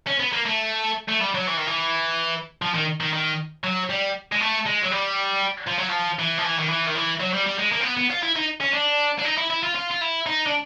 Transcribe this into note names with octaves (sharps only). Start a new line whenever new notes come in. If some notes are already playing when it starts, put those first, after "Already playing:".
C#4
B3
A#3
A3
A3
G3
F#3
E3
D#3
E3
F3
D#3
D#3
D#3
F#3
G3
G#3
A3
G#3
F#3
G3
F3
F#3
F3
E3
F3
E3
D#3
E3
D#3
E3
F#3
G3
G3
G#3
A#3
C4
B3
B3
F4
E4
D#4
C#4
D4
D4
D#4
E4
E4
F4
F4
F4
E4
D#4
D4